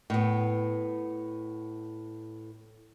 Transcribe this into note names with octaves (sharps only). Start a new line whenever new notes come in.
A2 B3